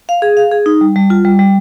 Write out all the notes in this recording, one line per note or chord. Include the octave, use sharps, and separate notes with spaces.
F5
G#4
F5
G#4
D#4
G3
G3
F4
G3
G3